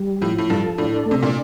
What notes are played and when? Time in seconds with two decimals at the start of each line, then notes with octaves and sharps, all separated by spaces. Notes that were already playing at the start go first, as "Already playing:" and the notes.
Already playing: G3
0.21 A2 F3
0.38 A2
0.50 G2 A4
0.78 A2 D4
1.06 A3
1.11 C3
1.23 A#2